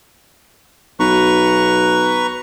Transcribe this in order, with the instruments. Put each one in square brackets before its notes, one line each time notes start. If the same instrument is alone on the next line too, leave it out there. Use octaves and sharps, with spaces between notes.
[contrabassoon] B1 [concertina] B4 A#5 C#6